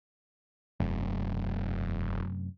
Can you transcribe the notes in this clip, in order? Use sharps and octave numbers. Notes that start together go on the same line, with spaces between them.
E1 F#2 C3 A3